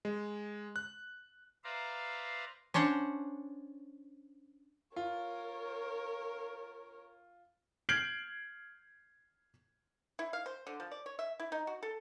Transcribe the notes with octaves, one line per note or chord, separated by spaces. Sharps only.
G#3
F#6
B4 C5 D5 E5 F5 A#5
C#4 D4 C5 C#5 F#5
F4 A#4 C#5
F6 G6 G#6 C7 D7 F#7
E4
F5
C5
D3
F3
D5
C#5
E5
E4
D#4
F#4
A4